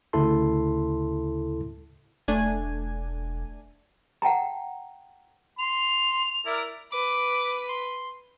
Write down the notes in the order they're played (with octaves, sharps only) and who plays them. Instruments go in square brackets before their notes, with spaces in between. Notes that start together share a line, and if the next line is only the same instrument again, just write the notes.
[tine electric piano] D2 C#3 E4 A4 A5 C6
[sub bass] E1 [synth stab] A3 D4 G#5
[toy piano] F#5 G5 A5 A#5
[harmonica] C6 [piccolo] F7
[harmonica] E4 A#4 D5
[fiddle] B4 [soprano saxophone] D6
[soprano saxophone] C6